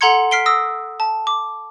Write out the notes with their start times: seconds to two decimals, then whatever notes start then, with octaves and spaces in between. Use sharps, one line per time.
0.01 A4 F#5 A#5 C6 G#6 C#7
0.31 F6 B6 C7 D7 G7
0.46 D#6 E6 A#6
1.00 A5
1.27 D6